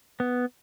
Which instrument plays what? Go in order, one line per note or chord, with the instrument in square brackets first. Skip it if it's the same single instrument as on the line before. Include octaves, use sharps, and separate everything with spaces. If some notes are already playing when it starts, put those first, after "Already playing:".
[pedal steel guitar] B3